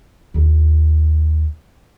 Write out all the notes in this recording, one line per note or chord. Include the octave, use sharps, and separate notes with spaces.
D#2 E4